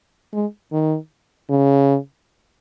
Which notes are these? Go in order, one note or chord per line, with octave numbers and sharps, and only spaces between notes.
G#3
D#3
C#3